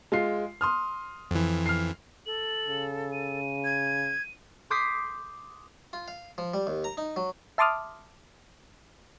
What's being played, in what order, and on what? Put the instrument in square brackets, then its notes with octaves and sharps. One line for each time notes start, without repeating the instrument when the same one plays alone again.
[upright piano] G#3 F4 C7
C6 D#6 F6
[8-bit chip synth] F2 E3
[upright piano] F6 C7
[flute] A4 [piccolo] F#7
[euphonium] C#3
[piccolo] D#7
[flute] G#6
[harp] C6 D6 D#6 G6 B6 C7
[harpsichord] F4
F5
F3
G3
D#2
A#5
D#4
F#3
[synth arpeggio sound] E5 A5 C6 D6 D#6 F6